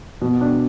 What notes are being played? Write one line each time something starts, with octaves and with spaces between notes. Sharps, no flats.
B2
D4